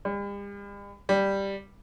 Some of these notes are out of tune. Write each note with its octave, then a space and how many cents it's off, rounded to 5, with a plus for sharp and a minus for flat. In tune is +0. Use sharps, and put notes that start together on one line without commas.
G3 +45
G3 +5